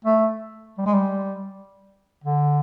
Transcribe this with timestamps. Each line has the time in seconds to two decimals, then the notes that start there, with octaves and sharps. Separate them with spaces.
0.05 A3
0.78 G3
0.86 G#3
0.94 G3
2.24 D3